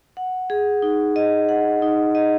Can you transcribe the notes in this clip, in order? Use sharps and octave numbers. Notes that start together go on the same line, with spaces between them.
F#5
G#4
D#4
D#5
F#5
D#4
D#5